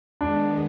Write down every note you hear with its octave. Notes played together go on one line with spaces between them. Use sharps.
D#3 G#3 B3 D4